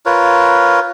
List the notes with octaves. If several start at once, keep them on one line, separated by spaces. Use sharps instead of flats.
F4 A#4 B4 C#5